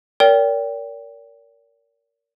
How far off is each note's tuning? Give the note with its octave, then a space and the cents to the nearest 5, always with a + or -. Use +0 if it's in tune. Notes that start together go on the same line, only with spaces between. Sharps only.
A#4 -5 D5 -45 G5 +0